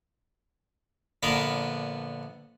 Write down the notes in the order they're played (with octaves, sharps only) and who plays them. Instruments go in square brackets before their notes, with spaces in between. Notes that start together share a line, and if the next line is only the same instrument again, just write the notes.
[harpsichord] A#1 D3 B3 A#4 B4